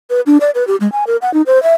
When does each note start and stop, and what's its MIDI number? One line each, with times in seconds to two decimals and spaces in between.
0.10 0.21 71
0.26 0.38 62
0.41 0.51 74
0.55 0.66 71
0.67 0.76 67
0.80 0.90 56
0.92 1.04 80
1.07 1.17 70
1.22 1.32 78
1.34 1.42 63
1.47 1.61 72
1.63 1.74 76